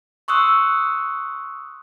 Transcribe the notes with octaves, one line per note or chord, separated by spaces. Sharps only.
C6 C#6 D#6 E6 F#6